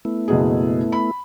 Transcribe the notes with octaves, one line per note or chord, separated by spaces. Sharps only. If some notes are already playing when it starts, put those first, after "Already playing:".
A3 B3 E4
F#1 B2 G#4
B5